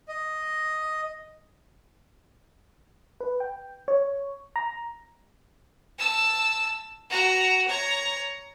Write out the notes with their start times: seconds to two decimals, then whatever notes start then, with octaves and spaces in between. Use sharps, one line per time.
0.08 D#5
3.20 B4
3.40 G5
3.88 C#5
4.56 A#5
5.99 A5 E6
7.10 F#4 A#5
7.68 C#5 A#5